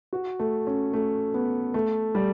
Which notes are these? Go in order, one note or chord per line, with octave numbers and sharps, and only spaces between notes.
F#4
A3
C#4
A3
B3
A3
G3